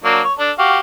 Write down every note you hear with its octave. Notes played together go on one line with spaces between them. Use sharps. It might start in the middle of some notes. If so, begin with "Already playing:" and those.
F#3 A#3 D4
C#5
D4 A4
F#4 G4 F5